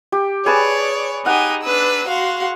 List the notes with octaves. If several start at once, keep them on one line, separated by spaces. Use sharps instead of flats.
G4
G#4 B4 C#5 D5 A5
D#4 G4 F#5 G#5 A#5
D4 B4 E6
F#4 F5 C6